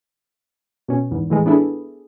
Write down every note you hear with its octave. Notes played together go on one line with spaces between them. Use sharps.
B2 C#4
E2 G#2
A2 E3 G#3
B3 D4 E4 G#4 A4